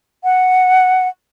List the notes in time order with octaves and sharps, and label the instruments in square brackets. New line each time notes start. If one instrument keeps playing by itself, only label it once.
[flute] F#5